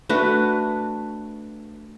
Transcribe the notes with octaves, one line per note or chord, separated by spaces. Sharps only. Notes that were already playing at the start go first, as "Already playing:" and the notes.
A3 D4 F#4 B4